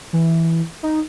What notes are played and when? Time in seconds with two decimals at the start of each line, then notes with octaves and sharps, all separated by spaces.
0.13 E3
0.83 D#4